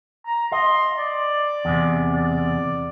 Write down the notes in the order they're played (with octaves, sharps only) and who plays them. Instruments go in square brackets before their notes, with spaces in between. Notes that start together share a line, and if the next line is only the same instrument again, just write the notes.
[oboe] A#5
[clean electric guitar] D#5 [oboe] C6
[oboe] D5
[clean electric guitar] E2 C3
[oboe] D5